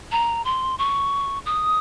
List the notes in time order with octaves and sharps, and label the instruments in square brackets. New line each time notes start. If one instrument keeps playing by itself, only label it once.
[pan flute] A#5
C6
C#6
D#6